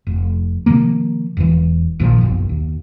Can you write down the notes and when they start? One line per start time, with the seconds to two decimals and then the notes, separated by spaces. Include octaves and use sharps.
0.07 F1
0.66 C3 D#3 F3 A#3
1.37 E1 E3
2.00 A#1 A#2 D#3 F3
2.21 F#1 B1
2.49 D#2